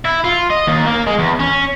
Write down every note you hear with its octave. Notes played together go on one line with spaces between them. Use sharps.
E4
F4
D#5
D#2
A#3
G#3
E2
C#4